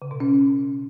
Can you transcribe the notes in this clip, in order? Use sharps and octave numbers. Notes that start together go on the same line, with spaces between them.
C#3
B2
C#4